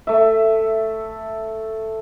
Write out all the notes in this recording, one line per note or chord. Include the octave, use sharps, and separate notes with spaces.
A3 E5